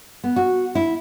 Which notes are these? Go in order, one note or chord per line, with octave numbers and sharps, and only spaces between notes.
B3
F#4
E4